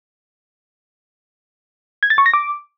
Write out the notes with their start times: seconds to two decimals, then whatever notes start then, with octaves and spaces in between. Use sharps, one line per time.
2.03 G#6
2.10 A6
2.18 C#6
2.26 A#6
2.34 D6